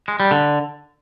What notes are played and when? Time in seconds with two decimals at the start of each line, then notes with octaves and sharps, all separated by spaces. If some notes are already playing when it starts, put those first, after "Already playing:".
0.08 G#3
0.20 G3
0.31 D3